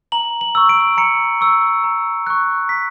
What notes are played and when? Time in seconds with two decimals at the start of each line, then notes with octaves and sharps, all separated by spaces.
0.12 A#5 F#7
0.41 F#7
0.55 C#6 E6
0.69 D7
0.97 A#5 C#7
1.41 C#6 E6
1.84 A#5
2.27 C#6 F#6
2.69 A#5 B6